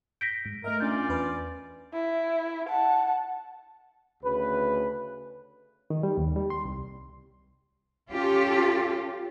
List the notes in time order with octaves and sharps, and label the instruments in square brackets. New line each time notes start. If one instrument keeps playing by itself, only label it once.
[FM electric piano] G6 [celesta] A#6 B6 D7
[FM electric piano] G#2
[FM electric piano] A3 D#5 E5 [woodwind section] A#4
[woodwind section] C#4 F4 D5 [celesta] D4 G6
[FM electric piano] E2 B4
[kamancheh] E4
F#5 A5
[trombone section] D2 C#3 B4
[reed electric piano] D#3
G3
D#2
G3
C6
C2
[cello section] C#4 F4 G4 A4